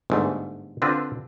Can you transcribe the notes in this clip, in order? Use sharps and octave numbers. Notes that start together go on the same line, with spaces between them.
G1 G#2 A3
D3 C4 D4 F4 B4